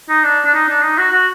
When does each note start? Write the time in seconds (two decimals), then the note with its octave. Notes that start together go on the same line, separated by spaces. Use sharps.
0.09 D#4
0.24 D4
0.45 D4
0.53 D#4
0.68 D4
0.82 D#4
0.98 F#4
1.12 F#4